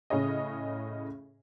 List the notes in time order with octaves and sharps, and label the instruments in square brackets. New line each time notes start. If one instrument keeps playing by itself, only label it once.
[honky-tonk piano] A2 C#3 G#4 C#5 D#5